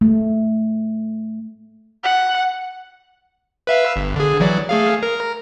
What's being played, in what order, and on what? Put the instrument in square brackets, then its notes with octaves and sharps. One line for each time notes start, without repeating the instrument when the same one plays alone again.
[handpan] A3
[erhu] F#5
[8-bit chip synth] B4 E5 F5
G1
D3 G#4
E3 F#3 D5
A3 G#4 F5
A#4